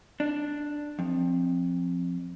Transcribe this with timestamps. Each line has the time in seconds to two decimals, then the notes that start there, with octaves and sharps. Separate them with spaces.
0.20 D4
0.99 F2